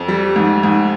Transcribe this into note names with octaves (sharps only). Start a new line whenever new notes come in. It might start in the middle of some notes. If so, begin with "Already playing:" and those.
Already playing: F2
G3
G#2
G#2